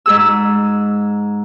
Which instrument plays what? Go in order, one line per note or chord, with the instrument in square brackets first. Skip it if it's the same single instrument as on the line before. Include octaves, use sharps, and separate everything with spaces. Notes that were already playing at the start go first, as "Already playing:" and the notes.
[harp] G#2 G#4 E6